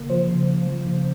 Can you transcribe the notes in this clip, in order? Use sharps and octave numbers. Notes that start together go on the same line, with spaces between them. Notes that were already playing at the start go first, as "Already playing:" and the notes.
Already playing: C#3 A#3
F3 C5
C#3
C#3
F3
C#3